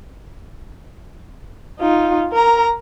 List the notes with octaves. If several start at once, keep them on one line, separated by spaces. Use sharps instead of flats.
D#4 F4
A#4 A#5